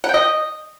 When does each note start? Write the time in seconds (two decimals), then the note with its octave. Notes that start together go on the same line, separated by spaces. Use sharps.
0.04 F#5
0.09 G5
0.14 D#5